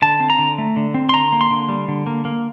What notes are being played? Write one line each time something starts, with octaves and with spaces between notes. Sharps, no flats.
D3 A5
C4
A#5
D3
A3
D3
C4
C6
D3 A#5
A#3
C6
D3
G3
D3
A#3
A#3